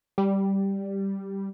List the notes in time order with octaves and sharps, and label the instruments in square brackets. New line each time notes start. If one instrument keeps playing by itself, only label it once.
[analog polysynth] G3